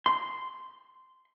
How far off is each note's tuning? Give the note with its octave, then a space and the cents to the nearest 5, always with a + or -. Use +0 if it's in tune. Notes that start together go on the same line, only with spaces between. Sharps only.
C6 -10